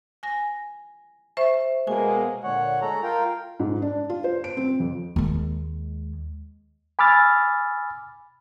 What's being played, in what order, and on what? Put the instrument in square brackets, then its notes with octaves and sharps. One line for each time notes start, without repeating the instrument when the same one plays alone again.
[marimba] G#5 A#6
C5 E5 C#6
[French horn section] B2 G#3 A#3 [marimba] G#5
[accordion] A#2 D3 C#5 F#5
G#3 A4 A#5
F4 A#4 G5
[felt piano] G#2
D4
F4
C5
D7
C4
F2
[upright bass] D#2 G#3
[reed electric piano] G#5 B5 D6 E6 F6 A6